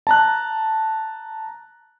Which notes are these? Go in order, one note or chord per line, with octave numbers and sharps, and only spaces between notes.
A5 A#5 F#6